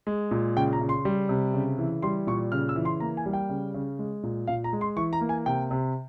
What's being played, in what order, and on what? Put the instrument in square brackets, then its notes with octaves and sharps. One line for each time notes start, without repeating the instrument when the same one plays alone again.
[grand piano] G#3
A#2
C#3 G5
A#5
C#3
C6
G3
C3
C#3
E3
G3 C6
A#2 C#6
C#3 F6
E6
E3
C6
A#3 A#5
G#5
G3
G5
C#3
C#3
G#3
A#2
A#2 F5
A#5
G#3
C6
E3 C#6
A#5
A#3
G#5
C3 G5
C3